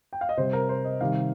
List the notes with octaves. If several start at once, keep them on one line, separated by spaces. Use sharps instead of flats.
G5
F5
D#5
C3 G3 C5
A#4
C5
D#5
C3 D#3 G3 F5